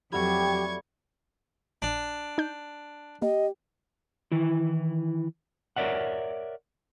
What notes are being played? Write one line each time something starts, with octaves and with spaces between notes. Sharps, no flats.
F2 F#3 G3 A3 F#4 G4 C#6 G#6
A#1 D4
D#4 G6
A#3 G4 D#5
D#3 E3 E4
A#4 C#5 D5 E5 F#5